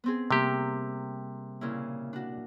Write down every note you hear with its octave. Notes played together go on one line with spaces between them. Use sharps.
B3 C4 G#4
C3 G3 A#3 C4 G4
A#2 C#3 E4
D4 F#4